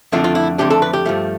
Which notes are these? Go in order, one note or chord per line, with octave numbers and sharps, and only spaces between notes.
F2 D3 A3 D4 F4
F4
E4
F2 D3 A3 D4 G4
A4
B4
G4
G2 F3 A3